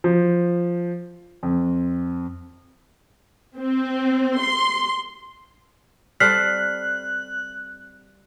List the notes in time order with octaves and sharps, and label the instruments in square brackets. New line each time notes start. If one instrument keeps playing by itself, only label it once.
[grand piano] F3
F2
[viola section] C4
C6
[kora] G3 C4 A4 [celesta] F6 B6 C7 [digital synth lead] F#6